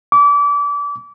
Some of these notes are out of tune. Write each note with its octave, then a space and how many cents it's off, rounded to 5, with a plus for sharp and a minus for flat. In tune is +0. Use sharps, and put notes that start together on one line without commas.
D6 -30